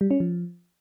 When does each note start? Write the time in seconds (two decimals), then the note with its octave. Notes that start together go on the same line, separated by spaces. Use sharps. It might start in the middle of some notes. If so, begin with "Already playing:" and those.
0.01 G3
0.11 C#4
0.20 F3